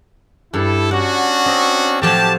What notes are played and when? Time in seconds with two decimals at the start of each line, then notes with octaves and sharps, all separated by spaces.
0.54 G2 E4 A4
0.91 C#4 D4 F#4 F#5
1.46 C4 D#5
2.02 A2 F3 F#3 G4 A5